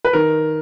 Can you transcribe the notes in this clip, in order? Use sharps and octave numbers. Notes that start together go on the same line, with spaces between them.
B4
D#3 A#4